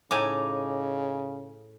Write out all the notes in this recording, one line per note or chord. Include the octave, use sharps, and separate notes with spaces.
A2 C#3 D#4 G#5 D6